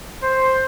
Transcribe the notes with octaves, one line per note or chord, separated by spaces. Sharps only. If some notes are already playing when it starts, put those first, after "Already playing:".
C5